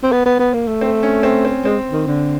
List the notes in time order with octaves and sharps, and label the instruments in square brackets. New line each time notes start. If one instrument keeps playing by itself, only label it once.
[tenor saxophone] C4
B3
B3
B3
A#3
A3
[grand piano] C4
C#4
C4
C4
[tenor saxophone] G#3 [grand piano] C4
[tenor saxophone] D#3
D3